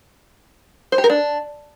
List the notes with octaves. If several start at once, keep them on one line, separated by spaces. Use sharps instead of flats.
C5
G4
A#4
D4